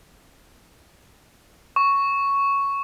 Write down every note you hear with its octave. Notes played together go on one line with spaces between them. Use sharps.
C#6